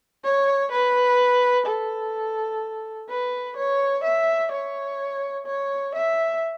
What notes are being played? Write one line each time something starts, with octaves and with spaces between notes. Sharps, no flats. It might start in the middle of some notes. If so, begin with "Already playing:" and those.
C#5
B4
A4
B4
C#5
E5
C#5
C#5
E5